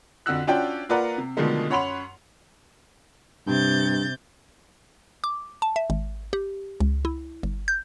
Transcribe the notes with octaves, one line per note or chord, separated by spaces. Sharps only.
F2 D3 F#4 E6 F#6
C#4 D4 F4 F#4 D5 G5
A#3 F4 B4 D5 F#5 A#5
C3
B2 D3 D#3 F3 G#3 A3
F#2 C#5 F#5 B5 C6 F7
G2 C3 G6 A6
D6
A5
E5
G#1
G4
C#2
E4
G1
G6